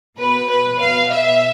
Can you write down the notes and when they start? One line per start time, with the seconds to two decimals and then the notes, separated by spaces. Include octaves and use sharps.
0.19 B2 B4
0.49 B4
0.80 B2 F5
1.11 E5